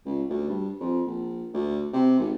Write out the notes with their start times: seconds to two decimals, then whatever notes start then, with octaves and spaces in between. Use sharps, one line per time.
0.05 C#2
0.29 D2
0.49 G2
0.80 F2
1.07 A#1
1.54 D2
1.93 C3
2.19 G#1